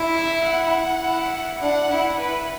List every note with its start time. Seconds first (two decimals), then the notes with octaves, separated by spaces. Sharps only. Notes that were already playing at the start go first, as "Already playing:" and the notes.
Already playing: E4
0.16 E5
0.45 F#5
1.03 E4
1.61 D4 F#5
1.90 E4
2.20 E4 B4